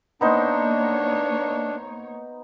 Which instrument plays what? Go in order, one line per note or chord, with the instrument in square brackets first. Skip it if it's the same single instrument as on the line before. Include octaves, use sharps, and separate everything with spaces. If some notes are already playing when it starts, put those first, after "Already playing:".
[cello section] A#3 C#5 [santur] B3 D#4 C5 [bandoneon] D4